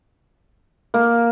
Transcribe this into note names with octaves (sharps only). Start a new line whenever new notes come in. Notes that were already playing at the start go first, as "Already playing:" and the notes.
A#3